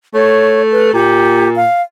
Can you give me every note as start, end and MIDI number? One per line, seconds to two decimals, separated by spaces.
0.15 0.93 57
0.15 0.62 73
0.72 0.93 71
0.93 1.67 46
0.93 1.50 67
1.56 1.82 77